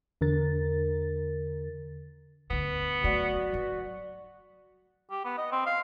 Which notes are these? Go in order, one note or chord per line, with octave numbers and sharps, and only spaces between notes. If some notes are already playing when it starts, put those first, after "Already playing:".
E2 D3 A#4 A6
D2 D3 B3
F#3 A3 F#4 D5
F#3
G4
B3
D#5
C4
F5